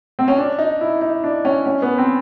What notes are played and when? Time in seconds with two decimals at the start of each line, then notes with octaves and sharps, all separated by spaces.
0.19 C4
0.28 C#4
0.38 D4
0.59 D#4
0.81 E4
1.01 D#4
1.24 D4
1.45 C#4
1.66 C#4
1.82 B3
1.98 C4